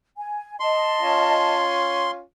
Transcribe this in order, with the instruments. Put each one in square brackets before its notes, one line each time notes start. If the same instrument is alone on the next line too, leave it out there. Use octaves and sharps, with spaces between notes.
[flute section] G#5
[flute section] D#5 A5 [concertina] C6
[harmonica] C#4 F4